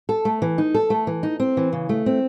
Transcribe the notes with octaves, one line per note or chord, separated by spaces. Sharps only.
A4
A3
E3
D#4
A4
A3
E3
D#4
C4
E3
C#3
A3
C4